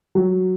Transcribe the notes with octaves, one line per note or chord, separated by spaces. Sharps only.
F#3